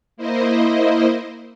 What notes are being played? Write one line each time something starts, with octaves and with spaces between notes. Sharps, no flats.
A#3 E4 C5 D#5